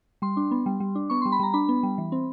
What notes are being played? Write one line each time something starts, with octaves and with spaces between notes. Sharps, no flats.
G3 C6
D4
B3
G3
G3
D4
B3 C#6
G3 C6
B5
G3 A#5
D4 B5
B3
G3
E3
C4